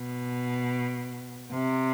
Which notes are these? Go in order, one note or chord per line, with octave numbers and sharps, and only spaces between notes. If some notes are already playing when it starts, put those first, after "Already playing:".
Already playing: B2
C3